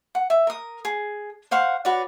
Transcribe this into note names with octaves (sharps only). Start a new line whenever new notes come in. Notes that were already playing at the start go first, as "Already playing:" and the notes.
F#5
E5
A#4 D#6
G#4
C5 F5 F#5 C#6
F#4 B4 C#5 D5